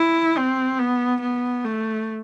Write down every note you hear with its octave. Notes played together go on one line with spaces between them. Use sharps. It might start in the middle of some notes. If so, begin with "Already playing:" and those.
Already playing: E4
C4
B3
B3
A3